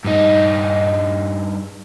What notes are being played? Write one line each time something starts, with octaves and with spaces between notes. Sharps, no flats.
G2 D#4